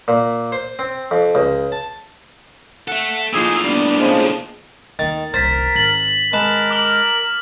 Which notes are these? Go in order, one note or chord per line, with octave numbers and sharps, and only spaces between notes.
A#2
C5
C4
F2
C#2
A5
A4 E5 F#5
A2 F3 A#3 D#4 F4 G#4 G#5 E6
G3 B3 D4
C#3 F3 G#3
D#2 D#3 A3 A6
D#1 C2 A#4 C5 A6 B6
G#1 A6 F#7
G#3 A#4 B4 A5
D6 F6 F#7